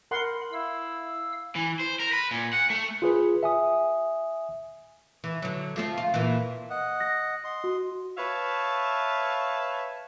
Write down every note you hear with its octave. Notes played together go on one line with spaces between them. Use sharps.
A#4 F#5 B5 C6
E4 F5 E6
E3
C5
A#4
B4
A#2
F#5
A3
F4 G#4 B4
E5 G#5 D#6
E3
D3 F#3
F3 A3 C4
F4
A#2 E3
D#5 F#5
A#6
D#5 C6
F#4
B4 C#5 E5 F5 A5